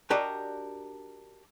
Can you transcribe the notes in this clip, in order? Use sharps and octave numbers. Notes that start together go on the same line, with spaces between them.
D4 F#4 G4 A#4 D5 D#5